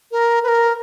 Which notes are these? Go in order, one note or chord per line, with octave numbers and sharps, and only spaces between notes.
A#4
B4
A#4